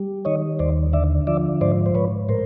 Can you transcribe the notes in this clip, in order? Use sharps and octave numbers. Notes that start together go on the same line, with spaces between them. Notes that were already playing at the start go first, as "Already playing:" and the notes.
Already playing: G3
D#3 C#5 D#5
D#2 C5 D5
D3 D5 E5
F3 D5 E5
G#2 C5 D5
C5
G#2 B4 C#5
A2 A#4 C5